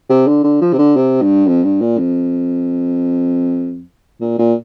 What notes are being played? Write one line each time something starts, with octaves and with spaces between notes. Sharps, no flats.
C3
D3
D3
F3
C3
D3
C3
G2
F2
G2
A#2
F2
A#2
A#2